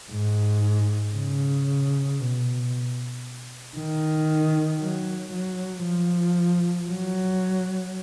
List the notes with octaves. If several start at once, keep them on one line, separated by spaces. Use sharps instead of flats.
G#2
C#3
B2
D#3
F#3
F#3
F3
F#3